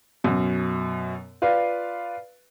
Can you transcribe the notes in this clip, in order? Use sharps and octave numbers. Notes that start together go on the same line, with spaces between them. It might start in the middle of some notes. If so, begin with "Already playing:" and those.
F#2 B2
F4 B4 D5 F5